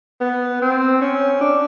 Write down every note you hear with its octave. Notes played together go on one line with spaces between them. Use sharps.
B3
C4
C#4
D4